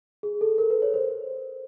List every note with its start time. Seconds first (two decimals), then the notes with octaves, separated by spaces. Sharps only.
0.23 G#4
0.41 A4
0.58 A#4
0.70 B4
0.82 C#5
0.94 C5